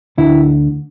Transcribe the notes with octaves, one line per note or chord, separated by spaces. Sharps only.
D2 D3 E4